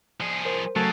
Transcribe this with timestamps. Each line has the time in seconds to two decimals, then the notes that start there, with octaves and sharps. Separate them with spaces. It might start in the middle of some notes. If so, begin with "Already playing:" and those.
0.20 F3 G#4
0.45 A#4 C5
0.76 C#3 F#3 A3 A4